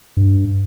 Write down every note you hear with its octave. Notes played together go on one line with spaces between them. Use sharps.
G2